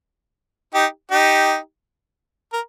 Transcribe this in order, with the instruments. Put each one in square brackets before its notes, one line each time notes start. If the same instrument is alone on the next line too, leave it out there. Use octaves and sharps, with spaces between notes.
[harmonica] D#4 G4
D#4 G4
A#4